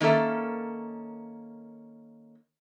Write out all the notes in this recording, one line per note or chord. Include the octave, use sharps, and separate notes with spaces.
D#3 A#3 C#4 A4 E5